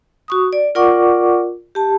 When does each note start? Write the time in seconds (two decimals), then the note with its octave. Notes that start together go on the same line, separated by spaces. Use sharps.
0.28 F#4 C#6 D#6
0.53 D5
0.75 F4 A#4 D5 F#5 C#6 D6
1.75 G4 A5